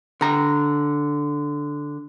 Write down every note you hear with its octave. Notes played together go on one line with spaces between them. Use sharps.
D3 A#5